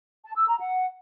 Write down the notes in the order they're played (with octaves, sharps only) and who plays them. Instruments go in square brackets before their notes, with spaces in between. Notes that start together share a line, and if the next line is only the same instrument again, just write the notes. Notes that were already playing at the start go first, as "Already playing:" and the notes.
[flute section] A5
E6
A#5
F#5